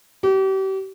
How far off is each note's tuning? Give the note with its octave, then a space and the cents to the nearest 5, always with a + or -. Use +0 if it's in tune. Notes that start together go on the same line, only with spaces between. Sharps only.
G4 -35